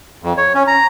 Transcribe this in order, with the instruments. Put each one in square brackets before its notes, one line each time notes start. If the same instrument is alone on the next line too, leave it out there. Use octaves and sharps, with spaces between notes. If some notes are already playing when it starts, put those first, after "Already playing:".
[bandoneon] F2
C#5
C#4
A#5